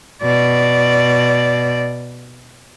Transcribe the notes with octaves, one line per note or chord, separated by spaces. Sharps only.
B2 D5